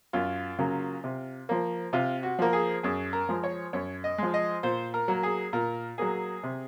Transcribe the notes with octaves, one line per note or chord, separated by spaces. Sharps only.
F#2 F4
C#3 F#3 A#3
C3
F3 A#3
C3 F4
F#4
F3 A#3
G#4
F#2 G#4
A#4
F3 G#3
C#5
F#2 C#5
D#5
F3 G#3
D#5
A#2 C5
A#4
F#3 A#3
G#4
A#2 A#4
F#3 A#3 G#4
C3